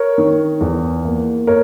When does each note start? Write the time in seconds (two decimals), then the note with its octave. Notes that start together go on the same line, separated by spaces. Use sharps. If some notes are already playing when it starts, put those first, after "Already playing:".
Already playing: A#4 C#5
0.18 D#3
0.61 E2
1.05 A#3
1.47 A#4 C#5